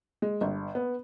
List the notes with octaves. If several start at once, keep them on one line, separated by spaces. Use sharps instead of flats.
G#3
G1
B3